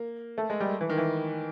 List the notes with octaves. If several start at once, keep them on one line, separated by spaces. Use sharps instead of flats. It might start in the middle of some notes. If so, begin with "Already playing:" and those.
Already playing: A#3
A3
G#3
G3
E3
D#3
E3